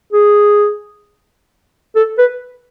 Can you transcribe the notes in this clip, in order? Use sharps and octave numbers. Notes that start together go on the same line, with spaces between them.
G#4
A4
B4